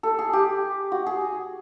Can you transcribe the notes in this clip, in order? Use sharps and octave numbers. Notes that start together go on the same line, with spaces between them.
A4
G#4
G4
F#4
G#4